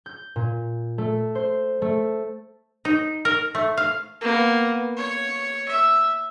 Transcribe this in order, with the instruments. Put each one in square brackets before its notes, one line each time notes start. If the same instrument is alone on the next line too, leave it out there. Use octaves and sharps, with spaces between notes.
[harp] G6
A#2
A3
C5
A3
[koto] D#4
A#4
A3
F5
[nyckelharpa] A#3 B3
C#5
E5